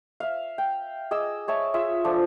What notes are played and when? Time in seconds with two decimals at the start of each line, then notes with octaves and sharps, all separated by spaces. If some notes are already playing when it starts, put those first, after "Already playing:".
0.20 E5 F5
0.58 G5
1.11 G#4 D#5 D6 E6
1.48 G#4 C#5 E5 A5
1.74 F4 G#4 E5
2.04 F3 D4 A4